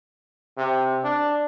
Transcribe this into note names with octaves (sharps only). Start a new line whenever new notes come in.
C3
D4